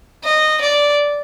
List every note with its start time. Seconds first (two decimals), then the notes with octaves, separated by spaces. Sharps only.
0.24 D#5
0.61 D5